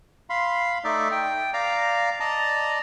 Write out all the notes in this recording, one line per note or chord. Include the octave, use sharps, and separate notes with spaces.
F5 B5 C6
A3 D#4 D5 E5
G5
D5 F5 A#5
D5 D#5 A5 A#5